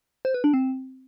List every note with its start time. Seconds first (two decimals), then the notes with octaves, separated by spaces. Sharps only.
0.25 C5
0.34 B4
0.44 D4
0.54 C4